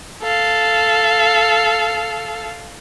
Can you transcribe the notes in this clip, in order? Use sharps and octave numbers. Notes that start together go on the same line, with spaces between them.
A4 F5